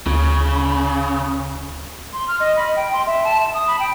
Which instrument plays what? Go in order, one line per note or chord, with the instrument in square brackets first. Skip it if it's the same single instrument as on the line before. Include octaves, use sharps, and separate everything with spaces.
[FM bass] D2 [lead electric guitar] C#3
[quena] C6
F6
D#5
B5
G5
C6
E5
A5
A5
D#6
B5
G5